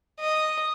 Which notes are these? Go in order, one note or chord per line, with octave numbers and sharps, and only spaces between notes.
D#5